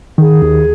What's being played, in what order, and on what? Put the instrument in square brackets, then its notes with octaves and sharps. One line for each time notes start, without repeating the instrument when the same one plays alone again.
[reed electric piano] D#3 [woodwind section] G#4
[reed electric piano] D#2